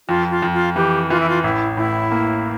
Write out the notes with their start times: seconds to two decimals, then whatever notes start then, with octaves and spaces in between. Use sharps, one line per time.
0.08 F2 F4
0.31 F4
0.42 F2
0.54 F4
0.76 E3 G4
1.10 E3 F4
1.20 E4
1.29 F4
1.43 A1 E4
1.77 A2 E4
2.11 A#3